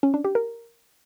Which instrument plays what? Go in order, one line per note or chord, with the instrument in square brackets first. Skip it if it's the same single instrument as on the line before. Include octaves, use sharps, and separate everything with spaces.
[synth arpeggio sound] C#4
D4
G4
A#4